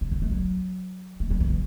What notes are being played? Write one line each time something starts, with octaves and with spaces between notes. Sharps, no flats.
C#3
F#3
A3
F#3
A3
F#3
E3
C#3